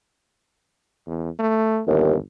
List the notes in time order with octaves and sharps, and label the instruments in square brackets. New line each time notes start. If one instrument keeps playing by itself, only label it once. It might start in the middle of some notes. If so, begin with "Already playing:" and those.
[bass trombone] E2
A3
[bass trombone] G1 [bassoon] D#2